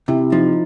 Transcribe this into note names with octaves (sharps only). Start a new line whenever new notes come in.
C3 E4
F3 D#4